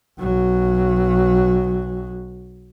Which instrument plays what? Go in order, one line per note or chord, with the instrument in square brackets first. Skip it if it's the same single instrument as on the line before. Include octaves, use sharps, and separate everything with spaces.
[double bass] B1 F#3